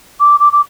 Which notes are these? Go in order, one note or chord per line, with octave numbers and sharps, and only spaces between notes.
D6
D6
D6